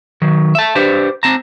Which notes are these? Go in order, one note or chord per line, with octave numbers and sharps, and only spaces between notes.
D#3 F#3
E5 A5
D4 G4 B4 C5
C4 A5 A#5